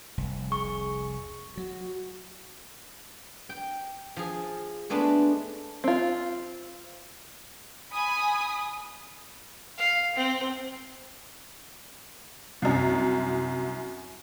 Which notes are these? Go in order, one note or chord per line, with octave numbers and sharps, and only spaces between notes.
F1 C2
G#4 C#6
F#3 F#4
G5
F3 G#4
G#3 A3 B3 D4
C4 F4
G#5 B5 D#6
F5
C4
C2 F#2